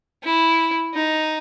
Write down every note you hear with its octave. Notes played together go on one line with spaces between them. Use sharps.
E4
D#4